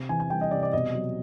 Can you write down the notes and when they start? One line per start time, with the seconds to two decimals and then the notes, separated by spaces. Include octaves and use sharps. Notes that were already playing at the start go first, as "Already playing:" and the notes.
Already playing: C3
0.09 E3 G#5
0.20 G#5
0.30 G3 G5
0.41 D#5
0.51 C3 D5
0.63 D5
0.73 B2 D#5
0.95 F#3